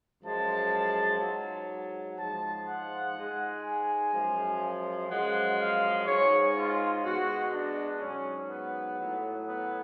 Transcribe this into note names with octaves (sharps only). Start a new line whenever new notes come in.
F#2 F3 G#3 A5
G#2 F#3
G#2 F3 G#3 A5
F#5
G#2 G#3
G#5
F#2 F3 G#3
F#2 F3 G#3 F#5
F5
G#2 G#3 C#5
F4
B2 G#3 F#4
D4
G#2 F#3 C#4
B3
A2 F#3
B3